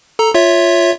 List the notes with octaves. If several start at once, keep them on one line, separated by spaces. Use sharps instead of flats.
A4 A#5
F4 C#5 E5